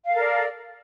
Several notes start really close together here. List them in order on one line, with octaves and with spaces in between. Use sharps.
F5 A4 A#4 D5